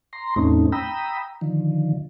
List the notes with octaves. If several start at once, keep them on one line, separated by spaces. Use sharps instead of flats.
A#5 C6
E2 A2 A3 C4 C#4 D#4
G5 A#5 B5 D#6 E6
D3 D#3 F3